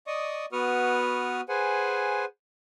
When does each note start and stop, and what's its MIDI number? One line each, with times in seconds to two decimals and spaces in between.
0.07 0.46 74
0.07 0.46 75
0.07 0.46 85
0.07 0.46 87
0.52 1.41 59
0.52 1.41 66
0.52 1.41 71
0.52 1.41 85
0.52 1.41 87
0.52 1.41 89
1.49 2.25 68
1.49 2.25 71
1.49 2.25 72
1.49 2.25 78
1.49 2.25 80